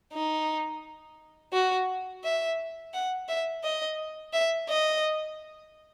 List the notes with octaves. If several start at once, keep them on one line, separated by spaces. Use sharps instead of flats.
D#4
F#4
E5
F#5
E5
D#5
E5
D#5